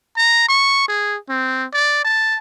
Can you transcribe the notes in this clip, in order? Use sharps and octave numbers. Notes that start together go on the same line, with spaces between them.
A#5
C#6
G#4
C4
D5
A5